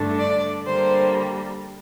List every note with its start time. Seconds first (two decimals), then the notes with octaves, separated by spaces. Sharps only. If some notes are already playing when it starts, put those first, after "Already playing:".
Already playing: G2 D3 A3 D4
0.19 D5
0.65 D3 G3 A#3 C5